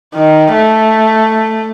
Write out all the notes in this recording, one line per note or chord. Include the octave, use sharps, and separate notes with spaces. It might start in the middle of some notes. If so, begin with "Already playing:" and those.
D#3
A3